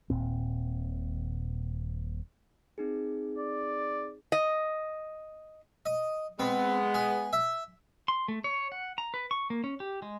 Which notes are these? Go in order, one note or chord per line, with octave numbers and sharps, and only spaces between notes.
D#1 A#2 C4
C4 D#4 G#4
D5
D#5
D#5
G#3 B3 C4
G#4
E5
C6
A3
C#5
F#5
A#5
B4
C#6
A#3
C#4
G4
G#3